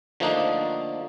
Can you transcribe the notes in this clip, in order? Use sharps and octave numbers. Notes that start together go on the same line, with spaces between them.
D3 F3 A3 A#3 D4 D#4